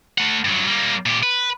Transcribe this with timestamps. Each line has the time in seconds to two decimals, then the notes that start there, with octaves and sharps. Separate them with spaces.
0.18 A3 F#5
0.45 G2 F#3
0.68 G3 A#3
1.06 A#2 G4
1.23 B4